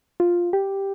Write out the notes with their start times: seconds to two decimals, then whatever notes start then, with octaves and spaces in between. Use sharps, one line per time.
0.20 F4
0.53 G4